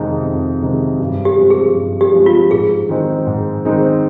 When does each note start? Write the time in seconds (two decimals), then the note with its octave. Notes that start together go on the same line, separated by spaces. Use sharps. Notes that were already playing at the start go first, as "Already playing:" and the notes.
Already playing: F2 C3 D#3 G#3 D#4
0.25 F2
0.62 C3 D#3 G#3 D#4
1.00 G2
1.25 G4
1.38 F3 G#3 C4
1.50 G#4
1.76 G2
2.01 G4
2.14 F3 G#3 C4
2.26 F4
2.51 G#2 G#4
2.89 D#3 G#3 C4 D#4
3.27 G#2
3.65 D#3 G#3 C4 D#4